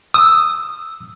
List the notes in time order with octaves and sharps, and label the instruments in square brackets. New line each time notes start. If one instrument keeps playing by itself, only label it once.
[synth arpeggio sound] D#6 [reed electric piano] E6